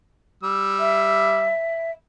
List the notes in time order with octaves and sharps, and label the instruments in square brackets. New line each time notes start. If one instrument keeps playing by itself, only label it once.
[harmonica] G3 E6
[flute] E5